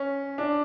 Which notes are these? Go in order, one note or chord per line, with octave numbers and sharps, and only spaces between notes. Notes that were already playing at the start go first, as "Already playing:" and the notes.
Already playing: C#4
D4